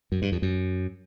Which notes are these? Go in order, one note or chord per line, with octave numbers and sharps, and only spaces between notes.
F#2
G2
F2
F#2